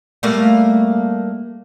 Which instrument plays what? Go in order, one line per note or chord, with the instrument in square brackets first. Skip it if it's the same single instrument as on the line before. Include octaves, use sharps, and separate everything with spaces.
[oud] G3 A3 A#3